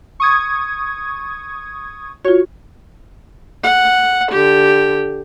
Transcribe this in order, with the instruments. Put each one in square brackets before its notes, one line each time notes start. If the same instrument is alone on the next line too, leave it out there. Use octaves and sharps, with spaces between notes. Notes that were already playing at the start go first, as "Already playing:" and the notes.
[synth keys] C#6 D#6 G#6
[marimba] F4 F#4 [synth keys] C#5
[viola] F#5
D3 G4